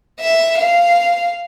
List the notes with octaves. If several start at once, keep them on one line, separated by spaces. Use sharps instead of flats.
E5
F5